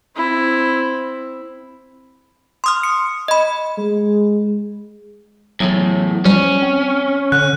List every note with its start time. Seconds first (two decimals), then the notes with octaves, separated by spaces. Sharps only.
0.16 C4 E4
2.64 C6 D#6 F6
2.83 C#7
3.28 D#5 B5
3.78 G#3
5.60 E2 A2 F#3
6.25 F3 G3 C#4
6.62 C4
7.32 D3 F#6